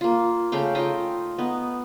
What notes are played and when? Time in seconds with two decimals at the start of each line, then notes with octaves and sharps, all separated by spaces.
0.01 A#3 F4
0.52 C#3 A3 F5 G5
0.75 D#4 F4 D#5 G5
1.38 B3 D#4